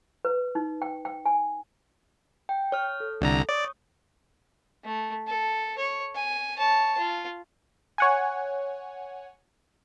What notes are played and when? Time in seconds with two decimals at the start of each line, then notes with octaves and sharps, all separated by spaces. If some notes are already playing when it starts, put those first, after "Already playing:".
0.25 B4
0.55 D#4
0.82 G5
1.05 G5
1.26 G#5
2.49 G5
2.72 C#5 F6
3.00 A4
3.21 C2 D3 A#5
3.49 C#5 D5 C#6 D#6
4.85 A3
5.27 A4
5.78 C#5
6.15 G#5
6.57 C#5 A5
6.97 F4
7.98 C#5 F#5 G#5